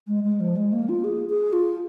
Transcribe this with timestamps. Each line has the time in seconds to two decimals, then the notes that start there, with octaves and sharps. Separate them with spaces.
0.08 G#3
0.24 G#3
0.40 F3
0.56 G#3
0.73 A#3
0.89 F4
1.04 G#4
1.29 G#4
1.53 F4